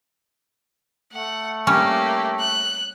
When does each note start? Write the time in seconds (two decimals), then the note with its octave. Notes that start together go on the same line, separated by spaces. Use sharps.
1.13 A3 F#5
1.67 G3 A#3 C#4 G4
2.40 F#6